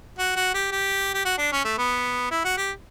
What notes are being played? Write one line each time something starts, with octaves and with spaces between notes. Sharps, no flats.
F#4
F#4
G4
G4
G4
F#4
D4
C#4
A3
B3
E4
F#4
G4